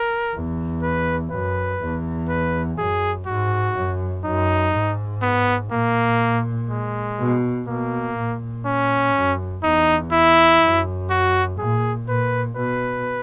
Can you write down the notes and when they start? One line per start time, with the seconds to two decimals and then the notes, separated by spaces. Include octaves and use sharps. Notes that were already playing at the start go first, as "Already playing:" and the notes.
Already playing: A#4
0.34 E2
0.83 B4
1.31 F#2 B4
1.81 E2
2.29 B4
2.78 F#2 G#4
3.27 G#2 F#4
3.76 F#2
4.25 F#2 D#4
4.73 G#2
5.22 B3
5.72 A#2 A#3
6.70 G#3
7.19 B2
7.68 B2 A#3
8.16 A#2
8.66 C#4
9.14 F#2
9.63 E2 D#4
10.12 E4
10.61 F#2
11.10 F#4
11.59 A#2 G#4
12.07 A#2 B4
12.56 B2 B4